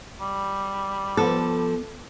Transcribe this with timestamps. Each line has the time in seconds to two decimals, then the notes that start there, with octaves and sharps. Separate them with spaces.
0.21 G3
1.17 F3 B3 A4